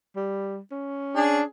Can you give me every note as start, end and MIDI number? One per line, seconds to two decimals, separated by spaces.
0.16 0.59 55
0.72 1.48 61
1.16 1.44 62
1.16 1.42 68